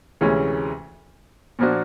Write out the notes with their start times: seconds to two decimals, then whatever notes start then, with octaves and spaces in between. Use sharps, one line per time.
0.21 D2 C3 E3 G#3 C#4
1.59 A#2 F3 A#3 D4 F#4